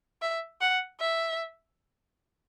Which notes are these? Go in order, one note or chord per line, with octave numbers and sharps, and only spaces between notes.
E5
F#5
E5